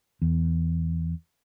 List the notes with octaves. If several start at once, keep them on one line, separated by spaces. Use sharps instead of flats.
E2